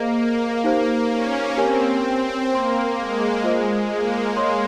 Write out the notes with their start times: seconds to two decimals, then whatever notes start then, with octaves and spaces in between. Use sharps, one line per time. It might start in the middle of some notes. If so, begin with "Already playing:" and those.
Already playing: A#3 G#4 C5 D#5
0.17 A#3
0.64 D#4 G4 C5 F5
1.11 C#4
1.57 C4 G4 A#4 C#5 G#5
2.51 A#3 C5 G5 C6
2.98 G#3
3.44 F4 C5 D#5
3.91 A#3
4.37 C#5 F5 C6